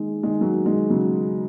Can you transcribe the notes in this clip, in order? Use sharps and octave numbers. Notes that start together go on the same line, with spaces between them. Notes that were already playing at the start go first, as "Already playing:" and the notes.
Already playing: D#3 G#3
D#3 G#3
F#3 A#3
D#3 G#3
C#3 F#3